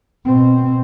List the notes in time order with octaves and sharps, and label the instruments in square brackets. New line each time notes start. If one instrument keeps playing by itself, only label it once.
[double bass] B2 C4